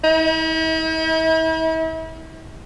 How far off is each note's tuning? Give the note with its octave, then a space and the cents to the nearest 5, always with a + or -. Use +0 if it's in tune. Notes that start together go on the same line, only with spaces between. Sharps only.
E4 -45